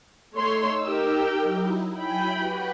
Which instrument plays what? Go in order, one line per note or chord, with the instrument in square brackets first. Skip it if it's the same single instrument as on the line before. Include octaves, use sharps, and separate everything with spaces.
[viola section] A3 C#5 C6 [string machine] D#4 E6
[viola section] G4 A#4 G5
[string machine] F#3 D#4 E4
[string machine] F#3 E4 G#5 [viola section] G5 B5
[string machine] F#4 G4 B4